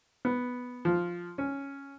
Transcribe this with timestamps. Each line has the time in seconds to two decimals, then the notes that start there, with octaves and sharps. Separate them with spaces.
0.25 B3
0.85 F3
1.38 C#4